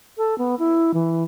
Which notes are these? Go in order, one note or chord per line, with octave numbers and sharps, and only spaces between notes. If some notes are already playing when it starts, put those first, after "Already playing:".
A4
B3
E4
E3